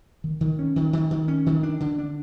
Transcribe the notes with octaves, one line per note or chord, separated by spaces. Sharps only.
D#3
D#3
C#4
D#3
D#3
D#3
C#4
D#3
D4
D3
D4